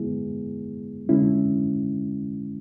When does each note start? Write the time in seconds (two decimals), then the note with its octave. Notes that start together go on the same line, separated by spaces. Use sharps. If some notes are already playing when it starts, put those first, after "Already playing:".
Already playing: D3 G#3 B3 E4 G#4
1.09 D3 G#3 C#4 E4